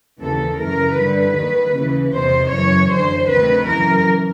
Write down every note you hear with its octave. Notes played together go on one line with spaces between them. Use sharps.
D#2 C#3 E3 A4
F#2 C#3 E3 A#4
G2 D3 B4
D#2 D#3
D#2 C#3 E3
E2 C3 D#3 C5
F#2 C#3 E3 C#5
F#2 D3 C5
D2 C3 D#3 B4
F#2 C#3 E3 A#4